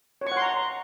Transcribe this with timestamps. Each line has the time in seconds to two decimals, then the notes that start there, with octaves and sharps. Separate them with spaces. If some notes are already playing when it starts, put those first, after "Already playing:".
0.21 C#5
0.27 C#6
0.32 F#5
0.37 C6
0.42 A#5